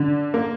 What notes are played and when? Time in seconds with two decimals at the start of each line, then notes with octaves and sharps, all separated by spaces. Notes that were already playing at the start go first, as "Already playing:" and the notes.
Already playing: D3
0.34 A#3